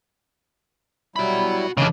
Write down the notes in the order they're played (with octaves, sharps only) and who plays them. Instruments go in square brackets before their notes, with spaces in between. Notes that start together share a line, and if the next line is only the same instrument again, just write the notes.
[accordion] F#3 G3 E4 [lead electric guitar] F#4 B5
[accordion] F2 C#4 [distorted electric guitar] C#3 D4 [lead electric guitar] E3 D#5